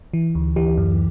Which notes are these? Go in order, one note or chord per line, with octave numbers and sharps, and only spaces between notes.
E3
D2
E3 G4
F#2